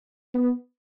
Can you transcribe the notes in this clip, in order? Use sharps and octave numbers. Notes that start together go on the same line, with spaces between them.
B3